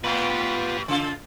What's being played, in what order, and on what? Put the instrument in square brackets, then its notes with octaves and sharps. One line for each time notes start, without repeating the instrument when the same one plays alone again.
[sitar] A2 [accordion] B3 F4 [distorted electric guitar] G4 B4
[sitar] C#3 F4